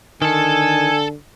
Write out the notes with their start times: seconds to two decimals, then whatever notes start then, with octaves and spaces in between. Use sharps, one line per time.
0.22 D3 D#3 A4 G#5 A5